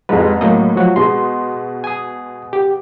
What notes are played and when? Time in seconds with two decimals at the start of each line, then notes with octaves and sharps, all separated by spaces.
0.09 F2 G#2 G3 G#3 B4
0.41 A2 F#3 A#3 D#5
0.76 F3 F#3 F#4
0.96 B2 G#3 C6
1.84 G#5 D#6
2.53 G4